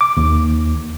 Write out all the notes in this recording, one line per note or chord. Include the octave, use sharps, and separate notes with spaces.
D6
D#2